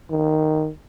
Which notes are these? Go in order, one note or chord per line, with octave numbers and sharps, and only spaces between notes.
D#3